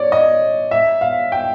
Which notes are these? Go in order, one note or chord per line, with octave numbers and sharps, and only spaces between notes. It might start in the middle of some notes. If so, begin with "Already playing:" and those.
Already playing: C#5 D5
D#5
E5
F5
G5